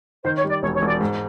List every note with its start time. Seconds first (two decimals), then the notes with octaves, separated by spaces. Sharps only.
0.25 D#3 C5
0.38 C#5
0.44 G3
0.49 D5
0.63 E1 C#5
0.76 C#5
0.82 E1
0.88 D5
1.01 G#2